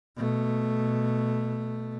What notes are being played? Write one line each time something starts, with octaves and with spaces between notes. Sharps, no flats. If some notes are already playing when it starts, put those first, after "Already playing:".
B2 A3